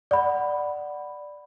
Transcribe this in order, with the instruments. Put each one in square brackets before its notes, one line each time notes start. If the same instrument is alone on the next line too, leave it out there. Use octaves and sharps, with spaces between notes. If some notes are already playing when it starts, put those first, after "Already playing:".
[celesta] D5 F#5 B5